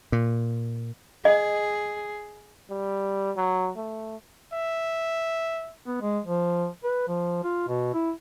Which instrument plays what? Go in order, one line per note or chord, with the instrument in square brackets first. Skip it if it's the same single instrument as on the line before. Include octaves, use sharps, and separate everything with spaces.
[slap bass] A#2
[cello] G#4 [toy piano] D#5
[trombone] G3
F#3
A3
[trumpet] E5
[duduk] B3
G#3
F3
B4
F3
F4
B2
E4